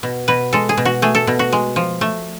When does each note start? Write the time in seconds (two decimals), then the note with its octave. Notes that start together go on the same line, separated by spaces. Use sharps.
0.03 B2
0.28 B2 B4
0.53 G#3 A4
0.69 G#4
0.77 B2
0.85 F#4
1.02 A3 G#4
1.15 A4
1.27 B2
1.39 F#4
1.52 G#3
1.76 F3
2.01 A3